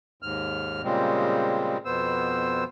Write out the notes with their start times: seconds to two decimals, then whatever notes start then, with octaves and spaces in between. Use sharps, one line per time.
0.22 D#2 G#2 F6
0.83 A#2 C#3 G3 G#3 C4
1.85 F2 B2 B3 C5 E6